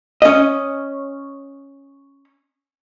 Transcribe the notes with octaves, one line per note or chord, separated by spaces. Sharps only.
C#4 D#5